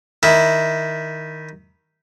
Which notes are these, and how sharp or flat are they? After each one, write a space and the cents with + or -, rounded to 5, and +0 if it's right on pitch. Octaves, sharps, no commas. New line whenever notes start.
D#3 +0 E4 -10